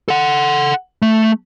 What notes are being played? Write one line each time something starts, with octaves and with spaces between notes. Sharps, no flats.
A4 F#5
A3